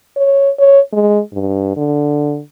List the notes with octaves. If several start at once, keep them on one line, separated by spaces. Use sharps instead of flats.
C#5
C#5
G#3
G2
D3